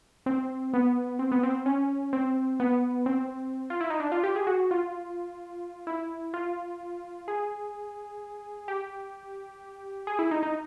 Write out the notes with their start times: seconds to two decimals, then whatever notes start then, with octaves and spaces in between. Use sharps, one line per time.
0.26 C4
0.74 B3
1.19 C4
1.32 B3
1.43 C4
1.66 C#4
2.13 C4
2.60 B3
3.06 C4
3.70 F4
3.81 E4
3.90 D#4
4.00 D4
4.12 F4
4.24 G4
4.36 G#4
4.47 F#4
4.71 F4
5.87 E4
6.34 F4
7.28 G#4
8.68 G4
10.07 G#4
10.19 E4
10.31 D#4
10.43 D#4